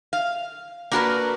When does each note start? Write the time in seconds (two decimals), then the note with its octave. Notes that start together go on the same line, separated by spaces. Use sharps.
0.13 F5
0.92 A#3 D4 F#4 G#4 A#4 B4